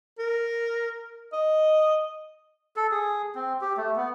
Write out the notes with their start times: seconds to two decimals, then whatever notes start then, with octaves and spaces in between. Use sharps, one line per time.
0.19 A#4
1.33 D#5
2.76 A4
2.91 G#4
3.35 C4
3.61 G4
3.77 A3
3.96 B3